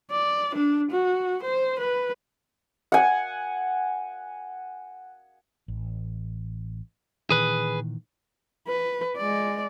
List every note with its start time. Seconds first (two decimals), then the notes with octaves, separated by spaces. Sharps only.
0.11 D5
0.55 D4
0.92 F#4
1.43 C5
1.79 B4
2.92 F#5 G#5
5.68 A1
7.30 A#2 D#3 E3 G#4 B4
8.68 B4
9.17 G#3 D5